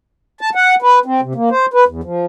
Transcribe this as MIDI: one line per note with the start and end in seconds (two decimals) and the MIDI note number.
0.41 0.50 81
0.55 0.75 78
0.82 0.99 71
1.06 1.21 60
1.22 1.33 48
1.35 1.49 58
1.51 1.66 72
1.74 1.84 71
1.88 2.01 40
2.04 2.26 53